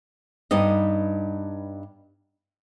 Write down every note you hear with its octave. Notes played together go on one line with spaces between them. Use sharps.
G2 B3 D#4 D#5